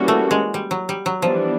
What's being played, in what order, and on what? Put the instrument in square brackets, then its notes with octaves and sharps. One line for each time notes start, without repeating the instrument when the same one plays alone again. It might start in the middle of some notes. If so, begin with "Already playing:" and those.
Already playing: [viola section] E3 G3 A#3 C#4 F#4
[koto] A3
G#3
G3
F#3
G3
F#3
[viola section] E3 G3 B3 D4 [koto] F3